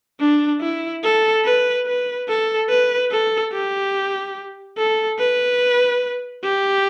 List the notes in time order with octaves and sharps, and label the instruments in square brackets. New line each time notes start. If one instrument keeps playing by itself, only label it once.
[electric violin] D4
E4
A4
B4
B4
A4
B4
A4
G4
A4
B4
G4